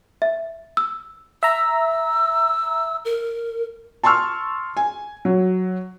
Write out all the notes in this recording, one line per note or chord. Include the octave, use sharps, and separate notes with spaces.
E5
E6
E5 A#5 E6
A#4
A5 C6 C#6 E6 F6
G#5
F#3